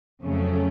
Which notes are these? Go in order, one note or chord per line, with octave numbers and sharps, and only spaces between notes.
F2 C#3 F#3 A3 C#4